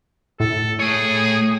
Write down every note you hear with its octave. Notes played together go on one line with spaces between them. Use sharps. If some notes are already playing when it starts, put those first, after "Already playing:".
A2 A4
A3 G#4 C#5